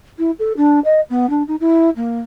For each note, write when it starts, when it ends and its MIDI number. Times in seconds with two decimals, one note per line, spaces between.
0.19 0.31 64
0.39 0.53 69
0.57 0.80 62
0.85 1.01 75
1.10 1.29 59
1.30 1.43 62
1.48 1.56 63
1.60 1.90 64
1.96 2.20 58